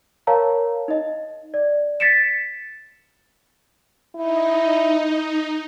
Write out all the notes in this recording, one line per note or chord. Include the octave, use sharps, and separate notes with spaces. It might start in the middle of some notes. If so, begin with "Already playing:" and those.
A#4 C#5 F5 A5 A#5
D#4 D#5
D5
A6 B6 C#7 D7 E7
D#4 E4